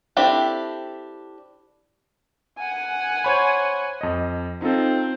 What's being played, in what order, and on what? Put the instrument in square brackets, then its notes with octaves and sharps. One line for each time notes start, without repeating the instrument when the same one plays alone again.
[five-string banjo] C4 D4 E4 G4 A4
[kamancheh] F#5 G#5
[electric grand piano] C5 C#5 B5
F2 D#5
[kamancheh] C4 [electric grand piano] D#4 F4 A4